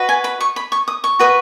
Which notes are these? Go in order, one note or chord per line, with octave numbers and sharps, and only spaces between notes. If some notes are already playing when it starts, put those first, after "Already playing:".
Already playing: F#4 B4 D#5
G#5
B5
C#6
B5
C#6
D#6
C#6
F#4 B4 D#5